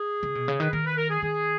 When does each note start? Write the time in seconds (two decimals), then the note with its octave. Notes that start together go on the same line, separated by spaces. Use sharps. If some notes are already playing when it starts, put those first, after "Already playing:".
Already playing: G#4
0.23 C#3
0.35 B2
0.48 C#3
0.60 D#3 B4
0.72 D#3 A#4
0.85 B4
0.97 A#4
1.10 G#4
1.22 D#3 G#4